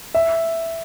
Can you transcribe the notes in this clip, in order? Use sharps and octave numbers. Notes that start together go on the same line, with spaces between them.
E5